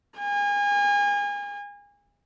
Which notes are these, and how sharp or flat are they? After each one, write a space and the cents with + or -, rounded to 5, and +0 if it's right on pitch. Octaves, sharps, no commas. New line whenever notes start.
G#5 -30